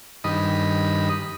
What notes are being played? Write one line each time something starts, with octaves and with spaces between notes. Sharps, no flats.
G2 D#3 D#5 B5